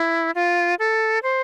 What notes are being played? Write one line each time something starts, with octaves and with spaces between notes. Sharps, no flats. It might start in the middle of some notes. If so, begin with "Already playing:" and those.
Already playing: E4
F4
A4
C5